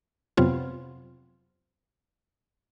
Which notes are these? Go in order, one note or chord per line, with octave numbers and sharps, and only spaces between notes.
F2 C3 F#3 B3 C4 F4